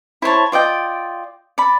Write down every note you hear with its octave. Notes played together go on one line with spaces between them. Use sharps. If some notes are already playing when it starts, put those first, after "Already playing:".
E4 C5 C#5 A5
F4 D5 D#5 G5
D5 B5